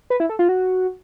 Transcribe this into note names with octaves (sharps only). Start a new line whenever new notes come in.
B4
E4
A4
F4
F#4